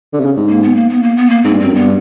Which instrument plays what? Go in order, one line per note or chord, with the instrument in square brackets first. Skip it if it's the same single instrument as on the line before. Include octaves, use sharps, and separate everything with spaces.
[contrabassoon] D3
C3
C#3
G#2
[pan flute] A#3
B3
A#3
B3
A#3
B3
A#3
[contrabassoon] G#2 [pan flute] C4
[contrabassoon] G2
[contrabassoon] F#2 [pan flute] C4
[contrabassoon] G2 [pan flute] B3